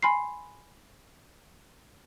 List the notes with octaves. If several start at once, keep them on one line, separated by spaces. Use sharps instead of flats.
G#5 B5 C6 C7